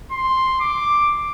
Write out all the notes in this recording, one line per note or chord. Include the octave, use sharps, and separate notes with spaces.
C6
D6